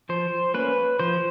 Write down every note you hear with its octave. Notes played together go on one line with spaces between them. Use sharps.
F3 C5
A#3 C#4 B4
F3 C5